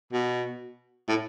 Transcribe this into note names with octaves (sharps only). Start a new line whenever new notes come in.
B2
A2